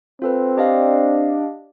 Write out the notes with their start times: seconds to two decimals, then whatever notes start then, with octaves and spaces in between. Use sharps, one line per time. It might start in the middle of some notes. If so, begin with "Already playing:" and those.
0.22 C4 F4 A4 B4
0.57 D4 G4 D#5 F5